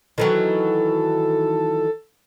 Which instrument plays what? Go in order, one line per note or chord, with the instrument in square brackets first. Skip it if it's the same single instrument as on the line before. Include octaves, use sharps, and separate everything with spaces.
[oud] D#3 E3 F#3 [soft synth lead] A4